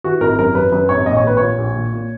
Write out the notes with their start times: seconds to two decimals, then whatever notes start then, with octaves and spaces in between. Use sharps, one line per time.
0.04 E3 F#4
0.21 G#1 A#4
0.38 F#2 A#4
0.55 F#2 B4
0.72 F#2 B4
0.89 G#1 C#5
1.06 A#1 D#5
1.17 C#5
1.23 A#1 B4
1.37 A#2 C#5
1.58 A#1
1.76 A#2
1.93 A#2